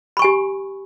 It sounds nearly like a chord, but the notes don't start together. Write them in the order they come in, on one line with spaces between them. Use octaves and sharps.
B5 C#6 G#5 G4